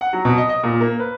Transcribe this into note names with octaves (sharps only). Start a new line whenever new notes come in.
F#5
F#3
B2
D#5
D#5
A#2
A#3
B4